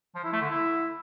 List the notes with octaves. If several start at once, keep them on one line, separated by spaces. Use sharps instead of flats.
F3
E4
A3
D3
E4